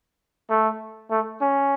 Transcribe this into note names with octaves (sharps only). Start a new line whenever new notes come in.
A3
A3
C#4